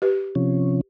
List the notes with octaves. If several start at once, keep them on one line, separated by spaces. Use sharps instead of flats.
G4 B4
C3 F3 C#4